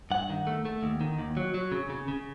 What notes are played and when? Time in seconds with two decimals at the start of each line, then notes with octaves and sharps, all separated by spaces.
0.11 G2 F#5
0.30 D#3
0.47 A3
0.65 A3
0.83 D#2
1.01 D#3
1.18 D#2
1.37 F#3
1.54 F#3
1.72 C#3
1.90 C#3
2.08 C#3